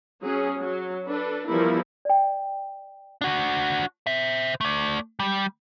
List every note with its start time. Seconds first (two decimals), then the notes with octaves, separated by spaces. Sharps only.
0.23 F#3 C#4 G#4
0.57 F#3
1.07 D4 A4 B4
1.47 E3 F3 G3 B3 E4 A#4
2.05 D5 G5
3.21 D4 F#4
4.07 C5 E5
4.61 A3 D5
5.20 G3